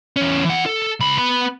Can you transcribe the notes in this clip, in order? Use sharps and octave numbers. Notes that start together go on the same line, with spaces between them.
E2 C#4
E3 F#5
A4
C#2 B5
B3 B5